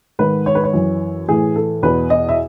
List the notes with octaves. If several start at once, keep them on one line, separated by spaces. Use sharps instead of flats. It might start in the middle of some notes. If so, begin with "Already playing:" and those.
G#2 D#3 B4
C#5
B4
C#5
F#2 E3
A2 E3 G#4
A4
E2 B2 B4
D#5
E5